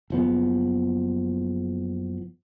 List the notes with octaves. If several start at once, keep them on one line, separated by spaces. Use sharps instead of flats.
F#1 F3 B3